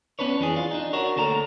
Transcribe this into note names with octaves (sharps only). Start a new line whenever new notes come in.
B3 C#4 D4 B4 C#5
F2 E3 D4 G#4
F4
D4 D#4
D4 F#4 A#4 C#5
D2 A#3 A4 A5 A#5